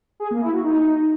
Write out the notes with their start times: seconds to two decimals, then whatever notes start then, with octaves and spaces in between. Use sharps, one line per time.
0.20 G#4
0.31 A#3
0.42 E4
0.53 F#4
0.64 D#4